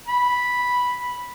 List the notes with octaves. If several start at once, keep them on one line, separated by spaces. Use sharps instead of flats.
B5